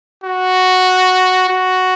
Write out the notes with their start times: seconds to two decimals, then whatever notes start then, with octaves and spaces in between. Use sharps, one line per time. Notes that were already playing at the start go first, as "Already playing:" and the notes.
0.24 F#4
1.49 F#4